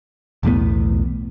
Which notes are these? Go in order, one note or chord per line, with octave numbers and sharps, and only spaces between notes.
B1 E2 A2 B3